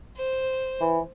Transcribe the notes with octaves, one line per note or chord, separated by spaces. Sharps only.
C5
E3